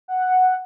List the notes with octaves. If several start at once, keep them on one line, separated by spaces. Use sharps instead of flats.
F#5